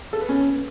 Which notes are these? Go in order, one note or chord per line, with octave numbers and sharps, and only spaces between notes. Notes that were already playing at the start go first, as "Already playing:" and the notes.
A4
B4
C#4